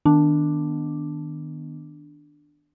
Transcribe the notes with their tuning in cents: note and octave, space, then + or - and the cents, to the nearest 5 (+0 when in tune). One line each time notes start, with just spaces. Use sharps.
D#3 +0 B3 +0 D4 +0